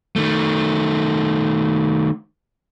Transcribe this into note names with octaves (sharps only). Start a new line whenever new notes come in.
D#3 A3